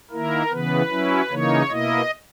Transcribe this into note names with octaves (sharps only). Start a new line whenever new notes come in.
D#3 A#3 E4 A#4
C#3 E3 B3 B4
F#3 C#4 E4
C#3 E3 A#3 D#4 C#5
B2 A#3 E4 D#5